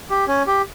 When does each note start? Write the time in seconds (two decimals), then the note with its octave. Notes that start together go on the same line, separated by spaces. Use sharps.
0.10 G4
0.28 C#4
0.47 G4